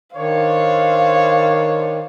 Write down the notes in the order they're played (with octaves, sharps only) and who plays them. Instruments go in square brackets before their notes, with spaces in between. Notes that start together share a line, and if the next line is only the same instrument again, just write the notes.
[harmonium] D#3 [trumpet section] D4 C#5 [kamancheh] C5 F5